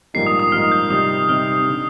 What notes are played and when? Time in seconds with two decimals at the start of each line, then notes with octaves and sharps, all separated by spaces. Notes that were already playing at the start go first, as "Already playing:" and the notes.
0.14 A#1 G#2 G3 A#3 D#4 C7
0.27 D#6
0.40 D#6
0.52 A#1 G#2 G3 A#3 D#4 F6
0.71 G6
0.90 C3 G3 C4 D#4 D#6
1.29 C3 G3 C4 D#4 F6
1.68 D3